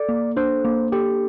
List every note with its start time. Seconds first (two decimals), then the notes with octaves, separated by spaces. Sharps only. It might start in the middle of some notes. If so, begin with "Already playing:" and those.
Already playing: A4 D5
0.09 A#3
0.36 D4 C5
0.65 A#3
0.92 G4 A4